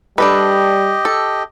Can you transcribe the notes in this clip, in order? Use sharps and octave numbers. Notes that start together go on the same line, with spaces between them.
G3 D4 G4 A4 B4 D#5
A4